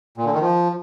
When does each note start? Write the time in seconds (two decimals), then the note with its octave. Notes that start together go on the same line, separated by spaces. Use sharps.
0.18 A#2
0.25 D3
0.33 D#3
0.41 F3